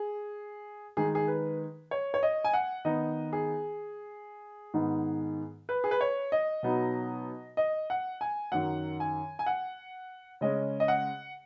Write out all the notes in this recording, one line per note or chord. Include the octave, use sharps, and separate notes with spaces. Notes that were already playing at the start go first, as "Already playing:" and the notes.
Already playing: G#4
D#3 G#3 D#4 G#4
G#4
B4
C#5
C#5
D#5
G#5
F#5
D#3 B3 D#4 D#5
G#4
G#2 D#3 B3 D#4
B4
G#4
B4
C#5
D#5
B2 F#3 B3 D#4
D#5
F#5
G#5
F#2 D#3 F#3 F#5
G#5
G#5
F#5
C#3 G#3 C#4 D#5
D#5
F#5